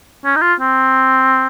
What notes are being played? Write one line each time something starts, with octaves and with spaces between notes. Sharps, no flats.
C#4
D#4
F4
C4